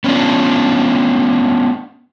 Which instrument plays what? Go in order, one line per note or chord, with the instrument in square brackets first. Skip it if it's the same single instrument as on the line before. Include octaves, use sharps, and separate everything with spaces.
[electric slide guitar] B3 C#4 D4 F4